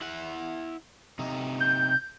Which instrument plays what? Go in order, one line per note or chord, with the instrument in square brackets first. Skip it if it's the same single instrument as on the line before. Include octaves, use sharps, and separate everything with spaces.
[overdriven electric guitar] E4 F#5
C3 D#4
[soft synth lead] G6